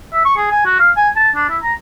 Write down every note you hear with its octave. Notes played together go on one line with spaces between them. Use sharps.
E5
C#6
G#4
G#5
F#4
F5
G#5
A5
D4
E4
A#5